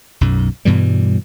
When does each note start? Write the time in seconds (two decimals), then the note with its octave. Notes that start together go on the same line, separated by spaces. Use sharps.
0.21 B1 F#2
0.65 G2 B2 E3 G3